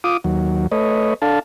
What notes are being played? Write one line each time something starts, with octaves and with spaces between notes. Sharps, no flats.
F4 D6 D#6
D#2 F#3
A3 B4 C#5 D#5
D4 A4 F5 A5